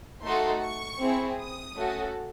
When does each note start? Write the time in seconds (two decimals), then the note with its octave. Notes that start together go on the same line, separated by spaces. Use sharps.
0.23 A3 D#4 F#4 A4 C6
0.62 C#6
1.00 C4 E4 G#4
1.39 D#6
1.77 A3 C#4 F#4 A4